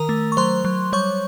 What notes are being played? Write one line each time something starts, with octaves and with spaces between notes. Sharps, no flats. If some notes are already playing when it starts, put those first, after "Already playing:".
Already playing: D#3 A#4 A#5
A3
C#6
F#3 C5 C6
F#3
G3 C#5 C#6